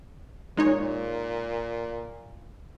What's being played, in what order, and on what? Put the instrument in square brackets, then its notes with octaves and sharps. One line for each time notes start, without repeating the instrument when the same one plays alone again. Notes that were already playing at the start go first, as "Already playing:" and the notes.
[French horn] A#2 [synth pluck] G#3 D#4 C#5